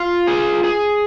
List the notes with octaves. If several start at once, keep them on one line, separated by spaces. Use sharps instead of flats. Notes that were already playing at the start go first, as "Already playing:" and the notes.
Already playing: F4
G#4
G#4